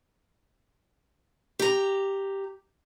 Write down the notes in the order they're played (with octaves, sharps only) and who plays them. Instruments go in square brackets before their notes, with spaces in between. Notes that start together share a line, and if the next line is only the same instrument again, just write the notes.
[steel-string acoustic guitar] G4 A#5